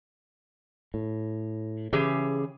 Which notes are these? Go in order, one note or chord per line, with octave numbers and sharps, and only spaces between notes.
A2
C#3 E3 G4 G#4